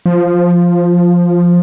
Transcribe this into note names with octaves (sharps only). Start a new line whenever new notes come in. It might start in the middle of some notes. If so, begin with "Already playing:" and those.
F3